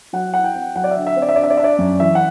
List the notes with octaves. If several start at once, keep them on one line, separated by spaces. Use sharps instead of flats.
F#3 F#5
E4 F#5
G5
C4
F#3 F#5
D5
E5
D3
E5
C4
D5
E5
D4 D5
E5
D5
D4 E5
D5
F#2
E3 E5
F#5